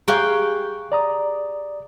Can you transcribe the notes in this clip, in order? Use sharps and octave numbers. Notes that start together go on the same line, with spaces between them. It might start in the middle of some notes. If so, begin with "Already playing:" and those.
G4 G#4 F5 A#5 C#6 F#6
D5 A#5 D#6